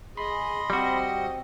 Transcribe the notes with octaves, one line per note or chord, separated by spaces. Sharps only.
G#4 D#5 B5 C6
G3 C4 F#4